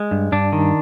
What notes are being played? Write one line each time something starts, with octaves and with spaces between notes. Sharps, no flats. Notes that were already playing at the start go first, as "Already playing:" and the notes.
Already playing: G#3
G2
G2 D4
D#3